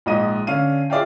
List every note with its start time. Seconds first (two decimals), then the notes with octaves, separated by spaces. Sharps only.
0.06 A#1 G#2 D#5 D#7
0.47 D3 C#4 F5 D#7
0.90 F4 G#4 D5 E5 F5 G5